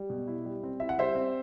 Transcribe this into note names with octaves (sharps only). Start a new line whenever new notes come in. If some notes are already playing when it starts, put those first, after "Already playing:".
Already playing: G3
B2
E4
G3
C4
E4 E5
F#5
G3 C5 E5
C4